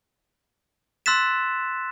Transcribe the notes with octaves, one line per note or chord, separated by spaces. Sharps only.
C6 E6 F#6 A6 B6 E7